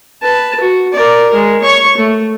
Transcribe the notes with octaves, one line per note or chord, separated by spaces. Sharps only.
B4 A5
F#4
A#4 D5
G#3 A#4
C#5 C#6
A3